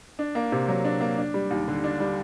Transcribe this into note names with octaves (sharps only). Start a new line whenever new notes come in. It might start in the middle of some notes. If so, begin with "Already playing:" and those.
D4
A#3
C3
F#3
D4
A#3
D4
G3
D#2
D3
D4
G3